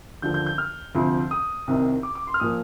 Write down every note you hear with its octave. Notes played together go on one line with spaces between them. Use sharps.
D#2 D3 F3 G6
G6
G6
F6
D2 C3 F3
D#6
C2 C3 D#3
D6
D6
C6
F6
A#2 F3 D#6